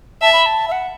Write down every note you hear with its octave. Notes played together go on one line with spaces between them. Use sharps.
E5 A5
B5
A5
E5
F#5